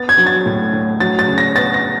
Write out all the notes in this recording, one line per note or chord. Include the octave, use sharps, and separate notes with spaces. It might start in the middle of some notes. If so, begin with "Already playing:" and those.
Already playing: B3 A6
G#6
F#3
A6
A2
A2
F#3 A6
A6
C#3
A#6
B3 A6
A#6